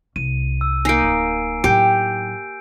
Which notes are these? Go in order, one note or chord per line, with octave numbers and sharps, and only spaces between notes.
C2 D#7
E6
A#3 D#4 G#5 C7 D7
D1
A2 F#3 G4 G6 D7